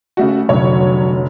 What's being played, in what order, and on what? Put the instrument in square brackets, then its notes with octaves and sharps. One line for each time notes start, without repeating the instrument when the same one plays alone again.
[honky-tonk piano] C#3 A3 F#4
[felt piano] F1 C2 D3 [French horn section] F#3 [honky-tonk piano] C#5